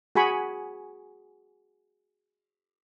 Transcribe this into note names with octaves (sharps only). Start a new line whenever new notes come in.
F#4 G#4 G#5 B5 C#6